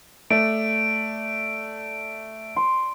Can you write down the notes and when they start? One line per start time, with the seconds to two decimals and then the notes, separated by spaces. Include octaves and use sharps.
0.30 A3 D5 D7
2.56 C6